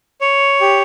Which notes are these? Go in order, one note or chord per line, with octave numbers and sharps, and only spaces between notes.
C#5
G4